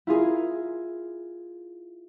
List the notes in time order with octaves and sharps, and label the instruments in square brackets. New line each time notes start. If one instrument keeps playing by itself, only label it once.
[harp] E4 F4 G#4 A#4